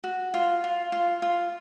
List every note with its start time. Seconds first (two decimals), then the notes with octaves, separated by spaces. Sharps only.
0.04 F#4
0.34 F4
0.64 F4
0.92 F4
1.22 F4